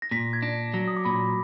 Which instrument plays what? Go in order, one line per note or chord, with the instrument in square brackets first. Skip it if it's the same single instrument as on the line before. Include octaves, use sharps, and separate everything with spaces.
[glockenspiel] A#6
[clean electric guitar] A#2 [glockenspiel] B6
[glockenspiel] G#6
[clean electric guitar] D4 [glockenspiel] A#6
[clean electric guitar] F#3 [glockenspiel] A#6
[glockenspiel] D#6
D6
[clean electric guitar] A#2 [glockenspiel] B5